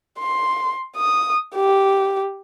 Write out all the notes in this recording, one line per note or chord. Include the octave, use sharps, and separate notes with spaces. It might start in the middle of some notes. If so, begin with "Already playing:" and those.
C6
D#6
G4